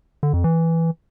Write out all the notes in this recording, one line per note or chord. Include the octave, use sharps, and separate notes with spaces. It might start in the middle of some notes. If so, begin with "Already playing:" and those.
D3
F2
E3